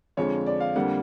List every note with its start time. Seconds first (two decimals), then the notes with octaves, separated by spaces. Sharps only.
0.17 F2 D3 F3 G#3 C#5
0.46 D5
0.60 F5
0.75 F2 D3 G3 A#3 F#5